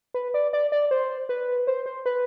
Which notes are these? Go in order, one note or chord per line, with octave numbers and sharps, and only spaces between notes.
B4
D5
D5
D5
C5
B4
C5
C5
B4